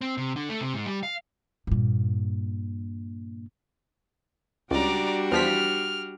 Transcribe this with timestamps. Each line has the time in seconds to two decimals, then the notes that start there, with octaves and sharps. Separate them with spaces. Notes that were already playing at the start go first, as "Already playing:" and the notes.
0.01 C4
0.17 C3
0.36 D3
0.49 A3
0.61 C3
0.74 G#2
0.86 G3
1.03 F5
1.67 G2 A#2
4.71 C#2 G3 D4 F#4 D5 A#5
5.32 E2 F3 F6 B6